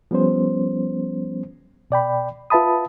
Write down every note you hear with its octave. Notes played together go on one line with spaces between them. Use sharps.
F3 G3 B3 C#4 C5
B2 D5 G5 B5
F4 B4 E5 A5 B5 D#6